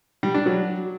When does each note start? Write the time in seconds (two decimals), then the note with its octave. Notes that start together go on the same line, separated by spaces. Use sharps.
0.23 G3
0.34 D4
0.46 F#3